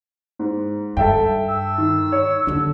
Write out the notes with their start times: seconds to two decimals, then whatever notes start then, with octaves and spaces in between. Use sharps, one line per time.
0.39 G#2
0.97 G2 A4 E5 G5
1.49 E6
1.78 D#3
2.12 C#5
2.47 D#2 D3 D4